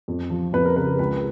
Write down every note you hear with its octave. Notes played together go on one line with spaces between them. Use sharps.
F2
F3
F2 B4
A#4
C#3 B4
C#2 B4